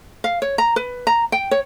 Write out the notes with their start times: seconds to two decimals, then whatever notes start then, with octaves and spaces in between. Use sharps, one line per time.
0.24 F5
0.42 C#5
0.58 A#5
0.76 B4
1.07 A#5
1.32 G5
1.51 C#5